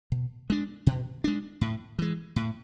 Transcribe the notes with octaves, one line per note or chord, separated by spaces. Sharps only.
B2
G#3 D4
B2
G#3 D4
A2
E3 G#3
A2